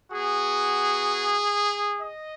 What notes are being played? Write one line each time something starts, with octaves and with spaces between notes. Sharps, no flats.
B3 F#4 G#4
D#5